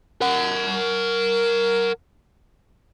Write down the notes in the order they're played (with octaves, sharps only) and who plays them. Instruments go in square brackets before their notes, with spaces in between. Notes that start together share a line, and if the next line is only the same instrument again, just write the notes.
[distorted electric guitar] A#4 F#5